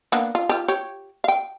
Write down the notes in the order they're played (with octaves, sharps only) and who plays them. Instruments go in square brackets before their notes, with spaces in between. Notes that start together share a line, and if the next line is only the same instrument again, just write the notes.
[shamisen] A#3 B3 D4
F4
F4 G4
G4 C#5
F5 G5